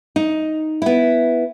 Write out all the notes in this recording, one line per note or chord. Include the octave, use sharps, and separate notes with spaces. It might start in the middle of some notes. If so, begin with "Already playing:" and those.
D#4
B3 E4